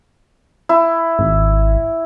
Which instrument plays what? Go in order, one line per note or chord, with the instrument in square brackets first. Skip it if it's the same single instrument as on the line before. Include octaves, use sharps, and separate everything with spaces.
[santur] E4
[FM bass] G#1